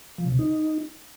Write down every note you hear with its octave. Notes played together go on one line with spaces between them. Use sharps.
F3
C#3
C3
D#4